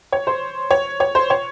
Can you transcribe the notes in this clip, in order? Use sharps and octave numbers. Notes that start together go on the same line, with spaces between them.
C#5
C5
C#5
C#5
C5
C#5